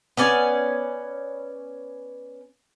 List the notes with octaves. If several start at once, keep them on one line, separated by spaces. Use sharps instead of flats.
B3 C#4 D5 G#5